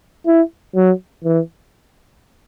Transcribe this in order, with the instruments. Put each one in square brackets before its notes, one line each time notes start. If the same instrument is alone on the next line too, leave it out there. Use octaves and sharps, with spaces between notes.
[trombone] E4
F#3
E3